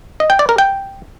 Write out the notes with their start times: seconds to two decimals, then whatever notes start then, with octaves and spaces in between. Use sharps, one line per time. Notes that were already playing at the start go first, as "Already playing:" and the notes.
0.20 D#5
0.30 G5
0.39 D5
0.49 A#4
0.58 G5